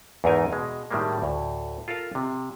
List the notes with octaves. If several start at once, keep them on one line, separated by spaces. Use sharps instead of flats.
E2 G#2 A3 D#4 A#4 G#5
B2 G#3
A2 D#3 G3 G#3 A#3
D2 A2
F4 A4 A#4 F5
C3